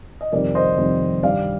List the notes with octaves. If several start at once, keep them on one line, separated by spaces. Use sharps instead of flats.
D#5
F2 C3 D#3 G3 A#4 D5
C5 D#5
F2 C3 D#3 G3
G2 D#3 G3 D5 F5